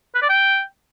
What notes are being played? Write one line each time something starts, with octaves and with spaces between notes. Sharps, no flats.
B4
D5
G5